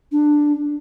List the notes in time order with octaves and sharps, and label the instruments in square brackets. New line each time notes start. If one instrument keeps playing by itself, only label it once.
[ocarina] D4